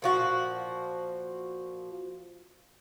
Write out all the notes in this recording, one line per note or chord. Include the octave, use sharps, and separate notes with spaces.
A#2 F3 F#4